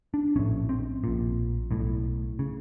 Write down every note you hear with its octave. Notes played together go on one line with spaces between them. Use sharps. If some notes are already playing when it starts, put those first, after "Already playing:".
D4
A#1 A2 C#4
C4
A#1 A#2
B1 A2
C#3